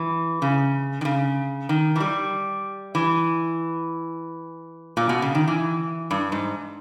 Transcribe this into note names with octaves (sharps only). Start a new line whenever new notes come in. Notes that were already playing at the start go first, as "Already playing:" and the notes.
Already playing: E3
C#3
D#3
C#3
D#3
E3
G3
E3
A#2
B2
C#3
D#3
E3
G2
G#2